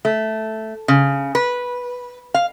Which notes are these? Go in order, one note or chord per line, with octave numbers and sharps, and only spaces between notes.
A3
C#3
B4
F5